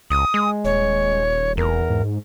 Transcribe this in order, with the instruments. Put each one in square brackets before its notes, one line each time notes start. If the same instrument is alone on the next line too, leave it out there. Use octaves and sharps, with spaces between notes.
[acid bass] C#2 [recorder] D#6
[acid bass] G#3
[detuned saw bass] D#1 [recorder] C#5
[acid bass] E2 [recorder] A#4
[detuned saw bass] G#2